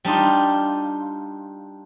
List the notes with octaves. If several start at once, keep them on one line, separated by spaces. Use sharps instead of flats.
G3 D4 D#4 F4